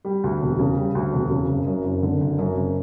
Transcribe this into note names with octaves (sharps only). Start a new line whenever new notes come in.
G3
D2
E1
C#3
G3
D2
E1
C#3
F#1
F#2
F#1
D3
F#1
F#2
F#1